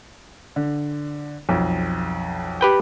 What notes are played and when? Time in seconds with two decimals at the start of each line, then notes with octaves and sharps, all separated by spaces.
0.56 D3
1.49 B1 F2
2.61 G4 B4 G5